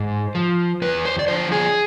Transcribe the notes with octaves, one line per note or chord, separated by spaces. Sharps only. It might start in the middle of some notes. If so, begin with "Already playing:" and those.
Already playing: G#2 C5
F3
E2 B4
C5
D5
D3 F3 C5
G#4